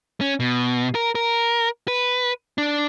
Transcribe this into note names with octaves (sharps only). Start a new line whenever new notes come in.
C#4
B2
A#4
A#4
B4
D4